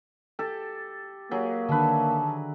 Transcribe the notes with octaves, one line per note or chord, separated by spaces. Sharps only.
G4 A4 A5
F#3 A#3 G4 G#4
D3 D#3 D4 B4 E5 A5